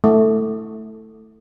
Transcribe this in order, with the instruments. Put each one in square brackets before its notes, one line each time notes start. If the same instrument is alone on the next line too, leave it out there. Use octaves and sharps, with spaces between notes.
[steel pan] A3